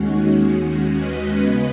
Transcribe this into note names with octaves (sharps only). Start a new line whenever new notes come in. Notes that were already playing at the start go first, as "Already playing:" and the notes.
Already playing: D#2 D#3 G#3 C#4 F#4
F#4
F#4
B4 D#5
C#3 G#3 B3 B4 D#5